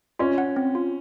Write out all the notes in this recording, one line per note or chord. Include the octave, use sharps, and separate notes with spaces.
C#4 F4
F#5
C4
F4